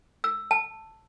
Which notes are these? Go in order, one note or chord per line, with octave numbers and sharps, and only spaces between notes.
E6
A5